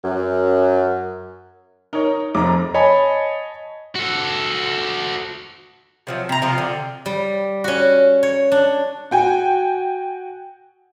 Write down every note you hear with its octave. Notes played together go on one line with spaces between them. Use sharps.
F#2
D#4 A#4 C#5
F1 F2 A#5 D6
C#5 D#5 G#5 A5 B5
F#4 A4
C3 F3 F#3
C3 A#5
C3 F3 F4
D3
G3
C#4 F#4
C#5
D4
F#4 G5 G#5